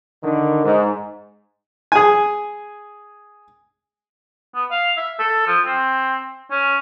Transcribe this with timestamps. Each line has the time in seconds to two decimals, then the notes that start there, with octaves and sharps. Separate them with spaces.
0.23 D3 D#3
0.65 G#2
1.92 G#4 G#5
4.55 B3
4.71 F5
4.97 E5
5.19 A4
5.47 F3
5.65 C4
6.51 C#4